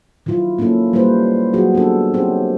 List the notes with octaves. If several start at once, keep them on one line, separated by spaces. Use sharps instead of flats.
D#3 F#3 E4 F4
A#3 C#4 D#4 E4 A4
G3 A#3 D#4 E4 B4 C5
F#3 D#4 F#4 G#4
A#3 B3 D4 A4
C4 C#4 D#4 G4 C5